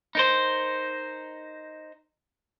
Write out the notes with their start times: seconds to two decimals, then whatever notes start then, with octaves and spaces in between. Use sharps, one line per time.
0.15 D#4 A#4 C5